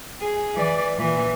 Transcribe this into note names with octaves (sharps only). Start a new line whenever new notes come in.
G#4
E3 D5
A#2 E3